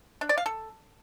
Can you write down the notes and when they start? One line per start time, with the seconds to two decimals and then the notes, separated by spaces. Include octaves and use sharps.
0.21 D4
0.29 D5
0.38 F5
0.46 A4